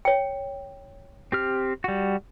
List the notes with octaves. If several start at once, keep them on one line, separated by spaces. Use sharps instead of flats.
C#5 G5
C4 G4 F6
G3 F#4